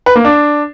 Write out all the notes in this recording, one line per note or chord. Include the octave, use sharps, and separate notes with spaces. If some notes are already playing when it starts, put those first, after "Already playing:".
B4
A#3
D4